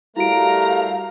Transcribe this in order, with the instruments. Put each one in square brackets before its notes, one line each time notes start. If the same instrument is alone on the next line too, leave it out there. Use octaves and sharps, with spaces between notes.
[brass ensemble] G3 A3 A#4 [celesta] E4 F#4 D7 [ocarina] F5 [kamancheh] A#5